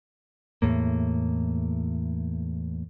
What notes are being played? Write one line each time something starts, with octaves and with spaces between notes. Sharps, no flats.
E2 A2 A#3